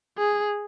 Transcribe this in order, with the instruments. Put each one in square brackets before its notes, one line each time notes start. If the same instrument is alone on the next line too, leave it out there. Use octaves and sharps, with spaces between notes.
[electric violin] G#4